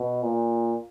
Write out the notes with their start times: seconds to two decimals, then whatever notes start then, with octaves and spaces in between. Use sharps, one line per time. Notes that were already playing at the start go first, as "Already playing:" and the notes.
Already playing: B2
0.23 A#2